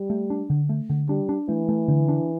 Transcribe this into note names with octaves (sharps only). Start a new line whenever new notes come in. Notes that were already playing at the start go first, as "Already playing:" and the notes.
Already playing: G3
A3
D4
D3
A3
D3
G3 D4
D4
E3 A3
A3
D3
D4